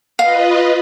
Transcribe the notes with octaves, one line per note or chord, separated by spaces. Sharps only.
F4 B4 D#5 F5